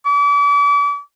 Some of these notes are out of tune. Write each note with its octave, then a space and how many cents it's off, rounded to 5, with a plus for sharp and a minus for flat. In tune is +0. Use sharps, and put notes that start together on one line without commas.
D6 -40